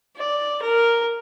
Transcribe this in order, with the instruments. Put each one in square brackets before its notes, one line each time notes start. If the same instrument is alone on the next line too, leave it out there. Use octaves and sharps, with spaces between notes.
[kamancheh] D5
A#4